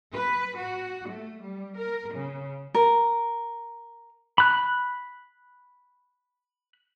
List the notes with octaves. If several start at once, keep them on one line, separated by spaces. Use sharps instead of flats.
B4
F#4
A3
G3
A#4
C#3
A#4
B5 F#6